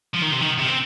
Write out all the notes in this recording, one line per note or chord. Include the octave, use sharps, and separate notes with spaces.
F3
D#3
C3
D#3
C3
C4